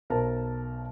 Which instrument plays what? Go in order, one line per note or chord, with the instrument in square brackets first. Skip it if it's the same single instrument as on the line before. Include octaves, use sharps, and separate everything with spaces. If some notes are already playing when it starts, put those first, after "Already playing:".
[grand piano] B1 A#4 C5 A5